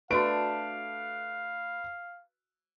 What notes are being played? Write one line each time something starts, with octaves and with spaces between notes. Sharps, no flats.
A3 D4 F#4 B4 F5 C#6 D7